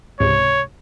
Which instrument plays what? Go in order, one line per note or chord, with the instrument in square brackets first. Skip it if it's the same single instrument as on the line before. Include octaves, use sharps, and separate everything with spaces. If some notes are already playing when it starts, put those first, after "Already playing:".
[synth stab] C#2 G#2 C3 [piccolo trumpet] C#5